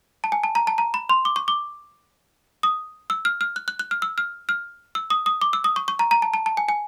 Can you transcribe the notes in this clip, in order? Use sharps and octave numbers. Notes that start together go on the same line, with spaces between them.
A5
G#5
A5
A#5
A5
A#5
B5
C6
D6
C#6
D6
D#6
E6
F6
F6
F#6
F#6
F#6
F6
E6
F6
F6
E6
D#6
D#6
D6
E6
D#6
C#6
C#6
A#5
A#5
A5
A5
A5
G#5
G#5